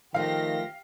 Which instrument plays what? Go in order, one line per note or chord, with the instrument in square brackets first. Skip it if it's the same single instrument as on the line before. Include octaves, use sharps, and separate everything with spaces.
[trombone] D#3 [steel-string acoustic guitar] F3 A3 [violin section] G4 A#6 [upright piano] F5